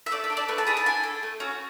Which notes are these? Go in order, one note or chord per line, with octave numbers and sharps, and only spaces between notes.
E5
A3 D5
E5
D4 A4
D5
A3 B4
A5
E4 G#4 B5
A5
D4 G#5
A4
A3
C#4 F#4